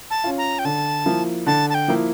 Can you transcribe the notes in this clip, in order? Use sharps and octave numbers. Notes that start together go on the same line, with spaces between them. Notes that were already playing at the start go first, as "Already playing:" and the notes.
A5
C#4 F4
A#5
G5
D3 A5
F3 A#3 E4
D3 A5
A5
G5
F3 A#3 E4